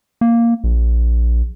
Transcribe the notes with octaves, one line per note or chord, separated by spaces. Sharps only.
A#3
A#1